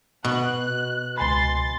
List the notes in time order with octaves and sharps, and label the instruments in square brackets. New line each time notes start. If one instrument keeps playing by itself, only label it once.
[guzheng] B2 [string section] F#6
[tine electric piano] C#2 G#5 B5 [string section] C6 A6